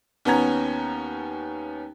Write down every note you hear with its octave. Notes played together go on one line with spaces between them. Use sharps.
D#2 B3 C#4 A#5 G#6